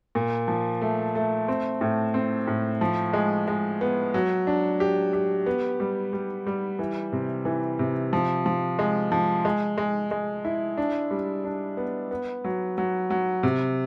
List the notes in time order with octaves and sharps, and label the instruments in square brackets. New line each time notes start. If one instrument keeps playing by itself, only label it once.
[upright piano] A#2
F3
A3
A3
C4
A2
C4
A2
F3
G#3
G#3
B3
F#3
D4
G4
G4
B3
G3
G3
G3
E3
C3
E3
C3
F3
F3
G#3
F3
G#3
G#3
G#3
E4
D4
G3
D4
B3
B3
F#3
F#3
F#3
C3